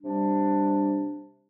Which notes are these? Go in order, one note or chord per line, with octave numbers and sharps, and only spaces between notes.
C3 G3 D4